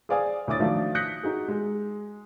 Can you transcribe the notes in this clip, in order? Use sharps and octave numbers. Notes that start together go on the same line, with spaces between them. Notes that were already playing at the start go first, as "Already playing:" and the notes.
G#4 C5 D5 F5 G#5 D#6
D2 E4 C#5 D6 D#6 A6
D#3 F3 F#3 A3 D4
D#6 F#6 G6 A#6 B6 C#7
D#4 F#4 G#4
G#3